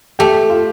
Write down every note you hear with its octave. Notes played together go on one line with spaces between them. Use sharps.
A3 G4
F4